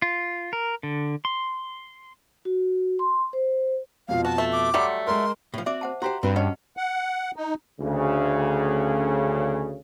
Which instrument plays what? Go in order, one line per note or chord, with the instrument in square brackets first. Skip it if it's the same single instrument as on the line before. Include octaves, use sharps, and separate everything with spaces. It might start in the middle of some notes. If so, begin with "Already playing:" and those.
[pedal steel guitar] F4
A#4
D3
C6
[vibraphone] F#4
C6
C5
[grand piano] F2 B2 F4 [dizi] F5
[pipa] F#4 [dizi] A5
[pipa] A3
[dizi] D6
[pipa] F#3 G3 A3 [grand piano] F#5 C6
[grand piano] G#3 A#4 [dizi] C6
[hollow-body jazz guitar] A2 F3
[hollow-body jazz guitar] C4 F#4 D5 [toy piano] E5 D6
[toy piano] C5 F#5 A5
[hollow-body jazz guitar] F#4 G4 C5 [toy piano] F#5 A#5 C6
[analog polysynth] G2 [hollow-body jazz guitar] C4 B4 [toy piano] F#4
[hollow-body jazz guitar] C#4 [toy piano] D#5 F#5 A5
[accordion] F#5
D#4
[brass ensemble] D2 C#3